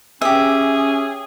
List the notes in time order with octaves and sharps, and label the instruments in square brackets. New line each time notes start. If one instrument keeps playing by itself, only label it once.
[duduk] C#4 [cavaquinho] G4 E5 [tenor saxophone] G#4